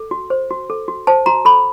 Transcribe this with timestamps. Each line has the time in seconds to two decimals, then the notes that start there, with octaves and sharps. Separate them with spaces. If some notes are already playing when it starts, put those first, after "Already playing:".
Already playing: A4
0.11 F#4
0.30 C5
0.51 F#4
0.70 A4
0.88 F#4
1.07 C5 A5
1.26 F#4 A#5
1.45 A4 B5